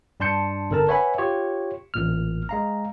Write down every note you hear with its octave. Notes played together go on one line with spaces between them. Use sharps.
G2 D4 A5 C6 G6 C#7
G1 D3 A4 A#4 A5
B4 C#5 E5 F#5 G#5 B5
F4 G4 C#5
A1 A#2 F6
G#3 F5 A#5